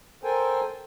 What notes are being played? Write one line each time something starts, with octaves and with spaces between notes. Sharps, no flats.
A4 A#4 C5 G5 G#5